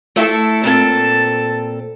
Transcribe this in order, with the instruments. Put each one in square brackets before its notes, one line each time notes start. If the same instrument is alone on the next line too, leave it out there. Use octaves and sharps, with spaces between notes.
[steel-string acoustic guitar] A3 E4 E5 [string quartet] A4
[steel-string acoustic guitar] A#2 C4 A4 [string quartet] A5 A6